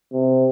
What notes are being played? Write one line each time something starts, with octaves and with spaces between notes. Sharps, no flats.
C3